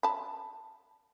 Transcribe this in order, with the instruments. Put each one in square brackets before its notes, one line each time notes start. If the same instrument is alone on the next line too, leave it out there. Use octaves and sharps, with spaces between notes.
[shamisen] A5 B5